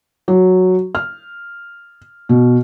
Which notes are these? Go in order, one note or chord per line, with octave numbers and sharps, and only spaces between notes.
F#3
F6
B2